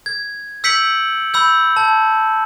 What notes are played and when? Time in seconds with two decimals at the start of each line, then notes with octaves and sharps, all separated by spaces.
0.06 G#6
0.64 E6 G6 B6 C#7 D7 F#7
1.34 B5 E6 G6
1.77 A5 G#6